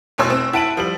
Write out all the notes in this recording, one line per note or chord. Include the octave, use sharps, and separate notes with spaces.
F1 E2 B2 C#5 C6 E6
C4
E4 F#5 A5 D7 D#7 F#7
F3 G3 F#7